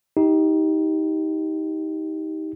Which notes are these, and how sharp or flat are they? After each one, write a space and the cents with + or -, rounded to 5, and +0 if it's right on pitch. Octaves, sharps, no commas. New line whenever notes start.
D#4 +25 G4 +0